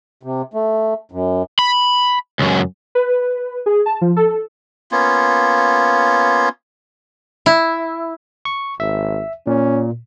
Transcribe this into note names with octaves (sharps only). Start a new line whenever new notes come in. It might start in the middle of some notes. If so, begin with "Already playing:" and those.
C3
A3
F#2
B5
C#2 F#2
B4
G#4
A5
F3
A4
A#3 B3 C#4 F4
E4
C#6
G#1 E5
A#2 C#4